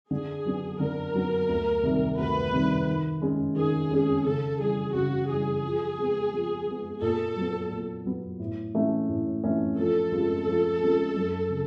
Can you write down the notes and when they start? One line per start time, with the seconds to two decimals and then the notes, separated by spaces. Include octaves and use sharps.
0.11 D3 G#4
0.45 F#3 B3 D4
0.80 D3 A#4
1.14 F#3 B3 D4
1.49 D2
1.83 C3 D#3 G3
2.18 D2 B4
2.52 C3 D#3 G3
2.87 D#3
3.22 G#3 C#4
3.56 D#3 G#4
3.91 G#3 C#4
4.25 C#3 A4
4.59 E3 G3 G#4
4.94 C#3 F#4
5.29 E3 G3 G#4
5.64 F3
5.98 G#3 B3
6.33 F3
6.67 G#3 B3
7.02 A#2 A4
7.36 F#3 B3
7.71 A#2
8.05 F#3 B3
8.39 A2
8.74 E3 A3 C#4
9.09 A2
9.44 E3 A3 C#4
9.78 F3 A4
10.12 G#3 C#4 F4 G#4
10.47 F3
10.81 G#3 C#4 F4 G#4
11.16 F#2
11.50 C#3